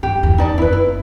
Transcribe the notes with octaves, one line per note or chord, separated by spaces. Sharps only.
G2 G4
E2
D#4 D5 A5
F#1 E4 B4
E4